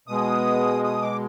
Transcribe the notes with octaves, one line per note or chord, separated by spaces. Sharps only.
B2 G#3 D#6
D#6
D6